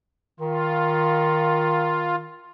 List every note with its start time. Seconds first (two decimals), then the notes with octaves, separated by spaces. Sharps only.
0.40 D#3 F4